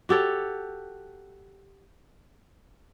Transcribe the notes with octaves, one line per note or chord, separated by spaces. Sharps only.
F#4 G4 A4 C#5